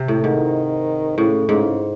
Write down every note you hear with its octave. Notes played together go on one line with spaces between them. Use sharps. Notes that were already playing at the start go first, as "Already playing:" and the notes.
Already playing: C3
A2
G#2 D#3
A2 C#3
G#2 C#3